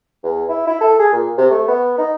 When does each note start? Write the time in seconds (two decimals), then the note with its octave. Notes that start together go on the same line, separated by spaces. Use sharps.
0.23 E2
0.49 E4
0.67 E4
0.81 A4
0.99 G#4
1.13 A#2
1.38 C3
1.51 A3
1.68 B3
1.98 D#4